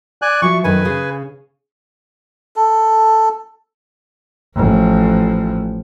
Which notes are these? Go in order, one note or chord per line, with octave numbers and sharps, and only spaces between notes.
D5 G#5 F#6
F3 F#4 E5 C#6
F#2 D#3 A3 B4 G#5
C#3 G#4
A4
A1 F3